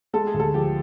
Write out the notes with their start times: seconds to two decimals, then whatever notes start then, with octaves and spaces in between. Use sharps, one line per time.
0.13 G#3 A4
0.27 G#4
0.34 D2
0.40 A4
0.54 F3 G4